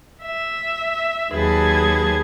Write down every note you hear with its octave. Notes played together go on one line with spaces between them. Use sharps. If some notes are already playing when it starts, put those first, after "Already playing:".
E5
D#2 F#3 G#4 B4 A5 G#6